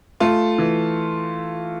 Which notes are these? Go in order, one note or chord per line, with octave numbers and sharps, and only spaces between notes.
A3 F4
E3